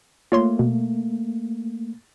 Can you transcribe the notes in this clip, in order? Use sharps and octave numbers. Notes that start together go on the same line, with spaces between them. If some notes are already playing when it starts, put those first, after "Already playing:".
A3 A#3 F4 C#5 C6
B2